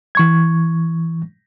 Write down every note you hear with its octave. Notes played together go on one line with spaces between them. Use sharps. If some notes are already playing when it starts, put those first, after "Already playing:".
E3 C#6 G#6